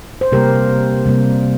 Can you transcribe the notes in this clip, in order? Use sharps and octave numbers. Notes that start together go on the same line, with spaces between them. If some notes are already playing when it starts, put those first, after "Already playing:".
C5
C3 G3 A#3 G4 A#4
C3 G3 A#3